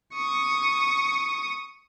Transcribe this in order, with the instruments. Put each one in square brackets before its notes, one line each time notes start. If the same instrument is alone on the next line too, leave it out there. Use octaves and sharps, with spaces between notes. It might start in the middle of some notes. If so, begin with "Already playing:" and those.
[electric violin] C#6 D#6